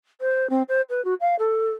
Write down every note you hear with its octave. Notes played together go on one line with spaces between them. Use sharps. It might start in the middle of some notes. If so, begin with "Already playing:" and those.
C5
C4
C5
B4
F#4
F5
A4